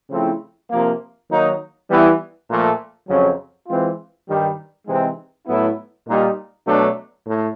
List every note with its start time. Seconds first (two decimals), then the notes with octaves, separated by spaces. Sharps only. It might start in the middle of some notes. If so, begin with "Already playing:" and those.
0.10 C#3 F3 A3 C4 E4
0.70 C3 F3 A#3
1.29 D#3 F#3 A#3 D#4
1.88 E3 G3 B3 E4
2.48 A#2 F3 A3
3.08 F2 C#3 F#3
3.68 E3 G#3 C4 F4
4.27 G2 D#3 G3
4.87 C3 E3 G#3 C4 D#4
5.47 A2 F#3 B3 E4
6.06 A#2 G3 A#3 D#4
6.66 B2 F#3 A3 D4
7.25 A2